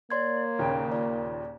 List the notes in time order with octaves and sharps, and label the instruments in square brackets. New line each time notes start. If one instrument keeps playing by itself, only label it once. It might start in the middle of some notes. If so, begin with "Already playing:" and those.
[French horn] A#3 [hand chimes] C#5 C6 G#6 [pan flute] D5
[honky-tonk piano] D#2 A#2 C#3 [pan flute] G5
[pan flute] F4 [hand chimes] D5